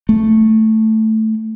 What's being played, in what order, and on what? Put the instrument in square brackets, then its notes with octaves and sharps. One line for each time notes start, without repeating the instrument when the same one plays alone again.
[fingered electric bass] A3